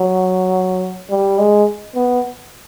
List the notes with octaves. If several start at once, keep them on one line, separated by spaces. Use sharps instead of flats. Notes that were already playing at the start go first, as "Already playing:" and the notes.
Already playing: F#3
G3
G#3
B3